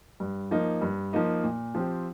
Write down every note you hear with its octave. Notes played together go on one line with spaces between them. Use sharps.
G2
F3 A#3 D#4
G2
F3 A#3 D#4
A#2
F3 C4 G4